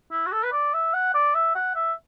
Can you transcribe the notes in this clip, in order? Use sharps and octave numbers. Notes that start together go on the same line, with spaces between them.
E4
F#4
A4
B4
D5
E5
F#5
D5
E5
F#5
E5